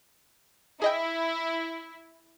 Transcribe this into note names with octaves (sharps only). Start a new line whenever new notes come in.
E4 G#4 D#5 G5